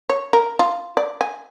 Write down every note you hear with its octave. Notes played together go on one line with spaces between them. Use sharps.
C#5
A#4
F4
D5
G#5